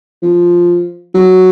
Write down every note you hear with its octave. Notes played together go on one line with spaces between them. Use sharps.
F3
F#3